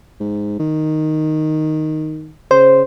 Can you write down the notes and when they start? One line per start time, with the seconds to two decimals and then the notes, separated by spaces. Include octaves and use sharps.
0.20 G#2
0.59 D#3
2.51 C#3 C5